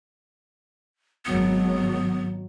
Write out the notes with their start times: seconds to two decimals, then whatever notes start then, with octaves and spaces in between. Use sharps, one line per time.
1.26 G#1 F#3 B3